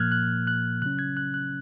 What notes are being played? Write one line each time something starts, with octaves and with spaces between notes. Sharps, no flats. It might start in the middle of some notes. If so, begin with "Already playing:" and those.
Already playing: A#2 F3 A#3 F6 F#6 G#6
F#6
F#6
C#3 F#3 C#4 F#6
G#6
F#6
F#6